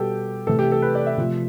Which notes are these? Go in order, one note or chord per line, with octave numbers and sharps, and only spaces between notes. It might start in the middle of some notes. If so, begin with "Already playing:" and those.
Already playing: B2 G3 G4 A4
C3 E3 A3 A4
G4
A4
B4
D5
E5
C3 F3 A3